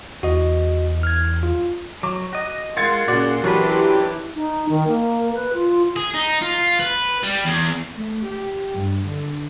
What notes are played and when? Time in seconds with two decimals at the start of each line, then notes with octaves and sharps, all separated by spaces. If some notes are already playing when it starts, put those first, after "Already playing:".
0.23 E2 F#4 D#5
1.03 F6 G#6
1.43 F4
2.03 F#3 D6
2.33 F#4 D#5
2.77 G#3 F4 A#4 F#5 C6 G#6 A6 C#7
3.08 A#2 C#3 F#4 D5
3.44 E3 F#3 C#4 D4 G4 B4
4.36 D#4
4.69 D#3
4.87 A#3
5.35 B4
5.53 F4
5.96 G#4
6.14 D#4
6.42 F4
6.80 B4
7.23 G3
7.46 E2
7.94 A3
8.25 G4
8.75 G2
9.09 D3